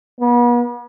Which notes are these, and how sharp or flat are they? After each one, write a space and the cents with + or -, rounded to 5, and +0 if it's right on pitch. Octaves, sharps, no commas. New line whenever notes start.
B3 -40